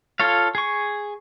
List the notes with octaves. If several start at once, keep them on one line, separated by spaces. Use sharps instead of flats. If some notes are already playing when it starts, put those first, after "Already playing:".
F4 A4 C#5 F5
G#4 C#6